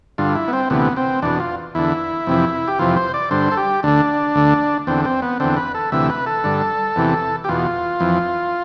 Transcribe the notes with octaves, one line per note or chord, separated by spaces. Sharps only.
G2 D3 F4
E4
B3
C4
D2 C3 E3 B3
C4
E2 B2 D4
F4
E2 D3 E4
F2 C3 E3
G4
F2 C3 E3 F4
C5
D5
G2 D3 C5
A4
G4
D2 D3 D4
D2 D3
E2 D3 C4
C4
B3
E2 D3 C4
B4
A4
D2 C3 E3 E5
B4
A4
G2 D3
E2 C3 E3
G4
E2 B2 F4
F2 E3